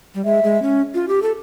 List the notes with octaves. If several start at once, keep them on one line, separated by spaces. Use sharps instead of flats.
G3
G#3 E5
G#3
C#4
F4
G4
A4